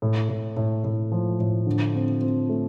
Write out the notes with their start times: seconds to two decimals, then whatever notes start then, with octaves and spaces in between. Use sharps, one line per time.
0.02 A2
0.29 A2
0.57 A2
0.84 A2
1.12 F3
1.40 A2
1.67 D3
1.94 C4
2.21 C4
2.49 A3